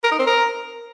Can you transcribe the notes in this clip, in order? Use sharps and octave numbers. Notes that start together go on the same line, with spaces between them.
A#4
D#4
C4
A#4